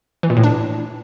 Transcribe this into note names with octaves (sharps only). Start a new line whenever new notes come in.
E3
A#2
A2
D4